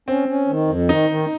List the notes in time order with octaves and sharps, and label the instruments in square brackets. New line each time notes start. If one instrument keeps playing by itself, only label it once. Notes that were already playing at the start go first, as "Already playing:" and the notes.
[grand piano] C4 [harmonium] C#4
[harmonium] C#4
D#3
F2
[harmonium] D#3 [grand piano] D#4
[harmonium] D#3